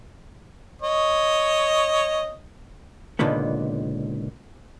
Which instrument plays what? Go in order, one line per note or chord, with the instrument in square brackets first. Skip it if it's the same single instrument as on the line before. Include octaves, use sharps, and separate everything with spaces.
[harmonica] C#5 D#5
[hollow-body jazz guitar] C#2 A#2 D3 D#3 B3